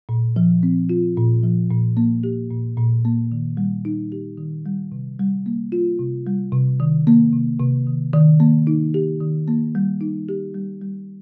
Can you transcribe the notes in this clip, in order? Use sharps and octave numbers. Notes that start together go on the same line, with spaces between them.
A#2
F3
C4
F4
A#2
F3
A#2
A#3
G4
A#2
A#2
A#3
D#3
G3
D#4
G4
D#3
G3
C3
G3
A#3
F4
C3
G3
C3
D#3
A#3
C3
C3
D#3
D#3
A#3
D#4
G4
D#3
A#3
G3
D#4
G4
G3
G3